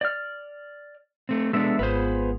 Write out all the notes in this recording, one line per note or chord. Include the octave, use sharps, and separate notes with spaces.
D5 F6
A3 C4
G#3 B3 D4 A4 E5
G#1 B3 F4 G#4 B4 C5